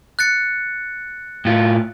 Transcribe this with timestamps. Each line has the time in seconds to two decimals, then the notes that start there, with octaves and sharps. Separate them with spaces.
0.19 F#6 A6 C#7
1.45 A2 F4